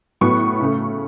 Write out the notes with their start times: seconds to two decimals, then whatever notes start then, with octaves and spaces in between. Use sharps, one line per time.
0.21 A2 F#3 B3 C#6
0.60 C#3 A3